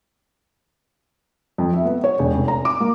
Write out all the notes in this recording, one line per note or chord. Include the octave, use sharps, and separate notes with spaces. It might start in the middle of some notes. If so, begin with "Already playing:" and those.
F2
E5
B3
C#5
E1
F1
A#5
D6
A#3